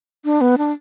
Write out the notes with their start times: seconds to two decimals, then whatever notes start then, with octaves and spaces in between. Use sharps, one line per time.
0.25 D4
0.41 B3
0.58 D4